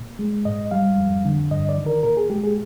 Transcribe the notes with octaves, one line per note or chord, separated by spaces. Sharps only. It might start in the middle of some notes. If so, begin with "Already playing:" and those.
Already playing: A#2
G#3
G#2 D#5
G3 F5
F2
D3
G2 D#5
D5
D#3
A#4
A#2 A#4
G#4
G#3 G4
G#4